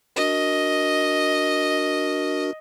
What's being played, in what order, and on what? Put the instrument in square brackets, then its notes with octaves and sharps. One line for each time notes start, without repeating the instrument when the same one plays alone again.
[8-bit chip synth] D4 F#4 A#4 [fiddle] D#5